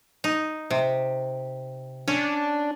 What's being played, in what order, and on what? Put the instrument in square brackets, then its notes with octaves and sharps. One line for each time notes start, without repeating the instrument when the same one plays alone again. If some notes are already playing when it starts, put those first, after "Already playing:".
[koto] D#4
C3
[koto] C#4 [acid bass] D4